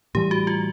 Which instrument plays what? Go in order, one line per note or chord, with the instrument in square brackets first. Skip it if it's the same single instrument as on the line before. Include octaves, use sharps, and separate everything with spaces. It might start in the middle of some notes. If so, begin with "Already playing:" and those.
[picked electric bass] A2 E3 G3 [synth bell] G4
[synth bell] F#4
F4